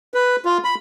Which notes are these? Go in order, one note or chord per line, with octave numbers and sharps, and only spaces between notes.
B4
F4
B5